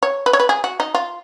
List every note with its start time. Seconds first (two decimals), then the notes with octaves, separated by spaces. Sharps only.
0.03 C#5
0.26 B4
0.33 C#5
0.40 B4
0.49 G#4
0.64 F#4
0.80 D#4
0.95 F4